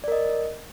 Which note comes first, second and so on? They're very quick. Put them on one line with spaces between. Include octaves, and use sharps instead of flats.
D5 A#4 D#5